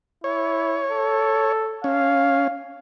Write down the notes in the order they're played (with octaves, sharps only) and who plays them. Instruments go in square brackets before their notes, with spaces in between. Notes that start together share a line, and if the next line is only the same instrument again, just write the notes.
[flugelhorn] E4 [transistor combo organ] C#5
[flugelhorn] A4
[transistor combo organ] C#4 [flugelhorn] F5